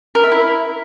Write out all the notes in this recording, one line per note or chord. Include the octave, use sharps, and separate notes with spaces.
A#4
E5
E4